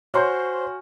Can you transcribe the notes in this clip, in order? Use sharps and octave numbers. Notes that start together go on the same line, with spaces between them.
F#4 C5 C#5 G#5 C6 C#6 F6 G6